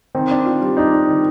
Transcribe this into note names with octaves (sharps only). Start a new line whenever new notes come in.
D#3 C4
D4
F4
G3
D4 D#4
D4
D#3